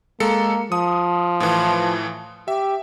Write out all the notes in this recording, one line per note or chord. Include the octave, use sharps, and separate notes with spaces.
G#3 A#3 A4 C#7
F3 D#6
A2 E3
G4 E5